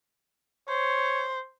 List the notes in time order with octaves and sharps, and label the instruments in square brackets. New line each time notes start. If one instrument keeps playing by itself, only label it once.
[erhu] C5 [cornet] C#5